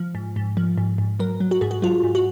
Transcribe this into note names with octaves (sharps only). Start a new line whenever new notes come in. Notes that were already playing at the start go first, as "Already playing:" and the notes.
Already playing: F3
G#2
G#2
F3
G#2
G#2
F#3 A#4
F#3
F#4
G#2 G#4
F#4
F#3 F4
G#2
F#4